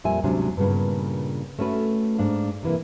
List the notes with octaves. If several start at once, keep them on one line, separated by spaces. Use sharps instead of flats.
F2 A#2 G3 E5 G#5
D2 G#2 C3 F#3 C#4 D4
G2 A#2 C#3 B3
A3 C#4 F#4 B4
G#2 D4 F5
C3 E3 A#3